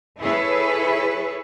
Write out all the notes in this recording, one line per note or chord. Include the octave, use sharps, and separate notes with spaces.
E4 G#4 A4 B4 C#5 E5